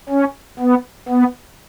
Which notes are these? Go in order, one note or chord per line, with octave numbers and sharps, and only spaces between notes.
C#4
B3
B3